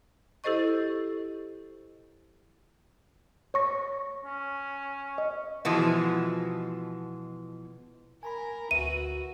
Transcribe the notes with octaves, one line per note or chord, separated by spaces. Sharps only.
E4 G4 A4 C5 D#5 C#6
C#5 C#6 A#6
C#4
D#5
B2 E3 F3 G#3
A#4 G#5 A#5 B5
D2 F#4 B4 E5 D#7